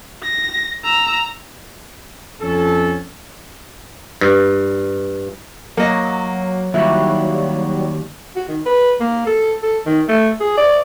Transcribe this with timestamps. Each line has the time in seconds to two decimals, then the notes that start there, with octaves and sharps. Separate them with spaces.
0.23 A#6
0.84 A#5 E6
2.41 F2 C#4 A4
4.21 G2
5.77 F#3 A#3 D#5
6.74 D#2 F#3 G3 E4 F#4
8.36 F#4
8.48 D#3
8.66 B4
9.00 A#3
9.27 A4
9.63 A4
9.86 D#3
10.08 A3
10.41 G#4
10.58 D5